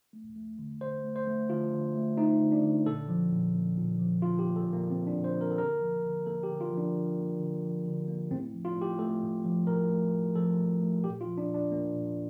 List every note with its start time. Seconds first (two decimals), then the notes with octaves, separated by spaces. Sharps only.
0.13 A3
0.36 A3
0.59 D3
0.81 D3 C5
1.04 A3
1.16 C5
1.27 A3
1.49 D3 F4
1.72 D3
1.95 A3
2.17 A3 D#4
2.40 D3
2.52 D4
2.63 D3
2.86 A#2 A4
3.08 F3
3.31 A#2
3.54 A#3
3.77 A#2
3.99 F3
4.22 A#2 F4
4.39 G4
4.45 A#3
4.56 A4
4.67 A#2
4.73 A#3
4.90 F3 C4
5.07 D4
5.13 A#2
5.24 C5
5.36 A#3
5.41 A#4
5.51 A4
5.58 D3 A#4
5.81 F3
6.04 D3
6.26 A#3 A4
6.43 G4
6.49 D3
6.61 F4
6.72 F3
6.77 D4
6.94 D3
7.17 A#3
7.40 D3
7.63 F3
7.85 D3
8.08 A#3
8.31 A2 C4
8.54 F3
8.65 F4
8.76 A2
8.82 G4
8.99 A3 A4
9.22 A2
9.45 F3
9.67 A2 A#4
9.90 A3
10.13 A2
10.35 F3 A4
10.58 A2
10.81 A3
11.03 A#2 G4
11.21 F4
11.26 F3
11.38 D4
11.49 A#2
11.54 D4
11.72 A#3
11.94 A#2